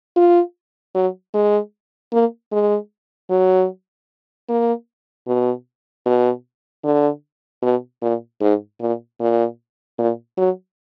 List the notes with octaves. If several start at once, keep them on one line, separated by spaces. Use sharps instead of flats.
F4
F#3
G#3
A#3
G#3
F#3
A#3
B2
B2
D3
B2
A#2
G#2
A#2
A#2
A#2
F#3